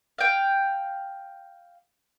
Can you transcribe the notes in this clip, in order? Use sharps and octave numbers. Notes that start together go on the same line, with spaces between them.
F5 G5